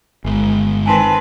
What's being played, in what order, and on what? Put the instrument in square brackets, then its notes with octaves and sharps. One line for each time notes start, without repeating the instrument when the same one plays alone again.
[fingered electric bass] G1 [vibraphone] G#3
[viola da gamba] D#3 C4 B4 [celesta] G#5 A5 C6